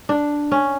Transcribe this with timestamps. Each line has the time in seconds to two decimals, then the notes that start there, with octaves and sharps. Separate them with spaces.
0.09 D4
0.52 C#4